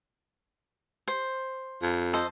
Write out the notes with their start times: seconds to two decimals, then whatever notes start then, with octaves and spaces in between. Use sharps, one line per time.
1.08 C5
1.82 F2
2.14 A4 C5 D#5